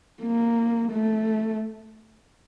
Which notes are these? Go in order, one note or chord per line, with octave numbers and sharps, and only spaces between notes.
A#3
A3